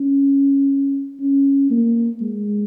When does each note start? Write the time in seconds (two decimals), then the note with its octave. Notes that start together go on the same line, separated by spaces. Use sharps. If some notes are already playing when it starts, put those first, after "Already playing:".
Already playing: C#4
1.20 C#4
1.71 A#3
2.21 G#3